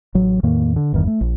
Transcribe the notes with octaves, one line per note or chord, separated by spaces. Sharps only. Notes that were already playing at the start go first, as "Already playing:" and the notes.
A1 F#3
E2 A2 D#3 A#3
D3
G1 E2 G2 D#3
A3
A#1